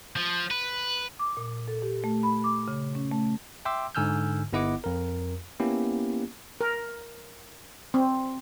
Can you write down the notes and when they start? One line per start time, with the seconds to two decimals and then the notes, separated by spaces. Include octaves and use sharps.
0.16 F3
0.51 B4
1.19 D6
1.37 A#2
1.68 A4
1.82 G4
2.04 A3
2.23 B5
2.44 D6
2.68 C#3
2.95 C#4
3.12 A3
3.65 E5 G5 C6 D6 E6
3.95 G#2 D3 G#5 E6 F6 G6
4.53 G1 B3 E4 D#5 F#5 D6
4.84 F2 A#4
5.60 A#3 B3 C#4 E4 G4
6.61 A#4
7.94 C4